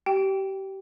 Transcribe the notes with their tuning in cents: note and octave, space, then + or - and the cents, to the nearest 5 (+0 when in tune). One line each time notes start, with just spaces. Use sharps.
G4 -25 G5 +0